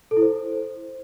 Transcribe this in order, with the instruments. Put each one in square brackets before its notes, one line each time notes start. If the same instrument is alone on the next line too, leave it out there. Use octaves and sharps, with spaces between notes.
[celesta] A4
E4
C5